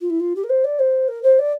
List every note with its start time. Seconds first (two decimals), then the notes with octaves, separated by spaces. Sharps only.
0.01 F4
0.09 E4
0.20 F4
0.35 G4
0.43 A#4
0.49 C5
0.64 D5
0.79 C5
1.08 A#4
1.23 C5
1.39 D5